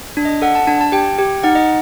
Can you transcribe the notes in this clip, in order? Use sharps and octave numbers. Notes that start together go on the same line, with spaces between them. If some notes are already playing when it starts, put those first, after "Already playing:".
D4
D#5
A4 F#5
A5
D4 A5
A5
G4 G5
G4
D#4 F#5
D#5